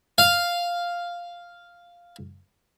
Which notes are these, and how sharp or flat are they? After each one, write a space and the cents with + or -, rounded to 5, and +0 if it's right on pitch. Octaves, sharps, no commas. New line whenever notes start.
F5 +0